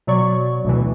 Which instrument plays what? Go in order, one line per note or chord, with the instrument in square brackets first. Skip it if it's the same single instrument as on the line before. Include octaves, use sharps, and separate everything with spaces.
[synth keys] B2 F#3 D5 C#6
D2 B2 E3